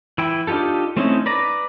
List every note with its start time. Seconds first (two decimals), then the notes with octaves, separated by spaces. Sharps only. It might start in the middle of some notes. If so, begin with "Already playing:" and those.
0.18 E3 E4 G5
0.47 D4 D#4 F4 G4 A4
0.97 A3 C4 C#4 D#4 E4
1.26 B4 D5 A#5